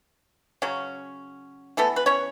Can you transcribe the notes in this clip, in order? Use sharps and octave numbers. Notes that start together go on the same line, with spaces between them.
C#3 F#3 C#4
E3 A3 B3 A4
B4
C#4 C#5